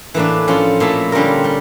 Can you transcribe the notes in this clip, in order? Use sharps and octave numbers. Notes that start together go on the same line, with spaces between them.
A2 E3 A#3 D4
F3 C#4 F4 A4
A#2 F3 A3 E4 A4
D3 G3 C#4 F4 A#4
G3